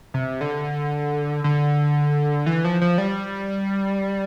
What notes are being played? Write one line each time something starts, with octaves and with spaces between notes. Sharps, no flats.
C3
D3
D3
E3
F3
F3
G3